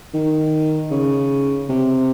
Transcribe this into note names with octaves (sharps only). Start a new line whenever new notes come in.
D#3
C#3
C3